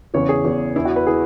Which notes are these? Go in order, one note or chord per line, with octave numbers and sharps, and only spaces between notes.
E2 C#3 E3 C#5
G#4
E2 C#3 E3
E2 E3 E4
F#4
B4
E3 G#4